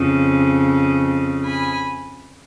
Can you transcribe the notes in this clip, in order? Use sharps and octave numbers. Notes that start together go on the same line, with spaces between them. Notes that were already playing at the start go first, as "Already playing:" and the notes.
Already playing: F2 C#3
G#5 B5